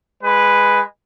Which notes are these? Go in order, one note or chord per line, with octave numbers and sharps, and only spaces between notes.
G#3 B4